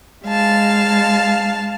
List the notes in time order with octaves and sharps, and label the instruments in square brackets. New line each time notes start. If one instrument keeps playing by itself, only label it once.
[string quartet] G#3 F5 A5